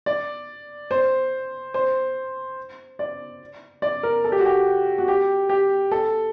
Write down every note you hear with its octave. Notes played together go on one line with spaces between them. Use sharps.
D5
C5
C5
D5
D5
A#4
A4
G4
F#4
G4
F#4
G4
G4
A4